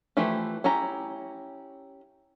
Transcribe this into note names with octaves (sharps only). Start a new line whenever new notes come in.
E3 F3 A3 E4 G4
C#4 E4 G4 A#5